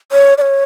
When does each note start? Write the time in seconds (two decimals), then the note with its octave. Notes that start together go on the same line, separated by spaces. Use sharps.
0.12 C#5
0.38 D5
0.41 C#5